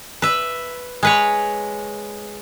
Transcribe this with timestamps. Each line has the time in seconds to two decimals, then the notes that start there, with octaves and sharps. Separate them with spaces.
0.22 B4 E5
1.03 G#3 B4 C#5